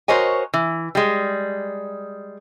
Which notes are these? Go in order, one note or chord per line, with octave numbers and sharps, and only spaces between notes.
F#4 A#4 C5 C#5 D#5 G#5
E3
G3 G#3